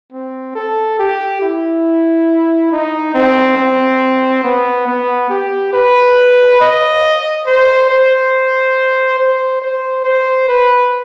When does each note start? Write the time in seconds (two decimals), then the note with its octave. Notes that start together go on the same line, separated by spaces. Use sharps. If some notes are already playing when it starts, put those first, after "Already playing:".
0.12 C4
0.55 A4
0.99 G4
1.41 E4
2.72 D#4
3.14 C4
3.57 C4
4.44 B3
4.88 B3
5.30 G4
5.73 B4
6.60 D#5
7.46 C5
7.90 C5
9.18 C5
9.62 C5
10.04 C5
10.48 B4